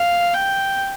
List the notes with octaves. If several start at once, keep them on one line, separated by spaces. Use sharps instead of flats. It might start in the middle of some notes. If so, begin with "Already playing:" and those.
Already playing: F5
G5